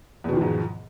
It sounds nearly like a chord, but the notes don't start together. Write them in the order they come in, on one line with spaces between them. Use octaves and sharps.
E2 B2 D#3 F3 G#2